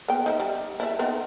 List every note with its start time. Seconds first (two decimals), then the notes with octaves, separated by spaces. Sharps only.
0.08 B3 G5
0.26 D#4 C5 E5
0.40 G3
0.80 E4 D5 E5
0.99 B3 C4 D#4